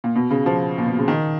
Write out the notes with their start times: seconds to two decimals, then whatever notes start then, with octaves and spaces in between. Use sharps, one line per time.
0.04 A#2
0.15 B2
0.31 C#3
0.46 F3
0.78 A#2
0.87 B2
0.98 C#3
1.08 D#3